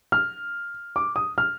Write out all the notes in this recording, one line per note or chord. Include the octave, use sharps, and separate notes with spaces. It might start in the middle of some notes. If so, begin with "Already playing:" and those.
F6
D6
D#6
F6